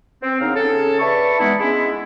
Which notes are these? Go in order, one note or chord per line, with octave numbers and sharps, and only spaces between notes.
C4
C#3 B3 D4 D#4 A#4 F5
C#3 C#4 G#4 A4
B4 D5 E5 A5 C#6
E3 G#3 B3 D#4 E4
G#3 B3 C#4 D4 E4